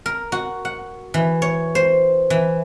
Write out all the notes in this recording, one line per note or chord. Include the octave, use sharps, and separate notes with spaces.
A#4
F#4
F#5
E3
C#5
C5
E3